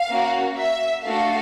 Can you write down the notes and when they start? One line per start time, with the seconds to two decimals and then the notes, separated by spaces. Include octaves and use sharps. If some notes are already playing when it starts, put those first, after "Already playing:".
Already playing: F5
0.10 A#3 C#4 F#4
0.57 E5
1.05 A3 D4 F#4 A4 F5